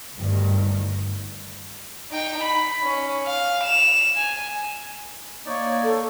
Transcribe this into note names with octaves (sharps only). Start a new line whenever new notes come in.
G1 D2 G2 D#3
D#4 G5
B5
C#4
F5
E7 F7
G#5
A#3 D#4 C#5 D5 C#6
A4